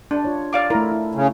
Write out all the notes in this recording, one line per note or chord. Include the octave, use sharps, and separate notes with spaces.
D4
F4 C#5
D5 F5 D6
A3 E4 A#4
E4
C#3